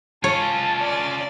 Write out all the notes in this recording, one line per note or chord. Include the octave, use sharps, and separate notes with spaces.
C#4 F4 C#5 A5
D5